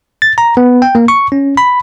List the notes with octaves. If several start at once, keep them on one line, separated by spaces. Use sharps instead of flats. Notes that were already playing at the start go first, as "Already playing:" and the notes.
A6
A#5
B3
G5
A#3
C#6
C#4
B5